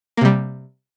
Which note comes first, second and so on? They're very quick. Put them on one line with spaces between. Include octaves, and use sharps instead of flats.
A#3 C3 G3